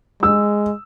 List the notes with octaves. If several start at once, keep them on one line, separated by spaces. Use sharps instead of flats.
G#3 E6